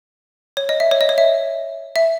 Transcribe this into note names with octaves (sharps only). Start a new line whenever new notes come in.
C#5
D#5
E5
C#5
D#5
C#5
E5
E5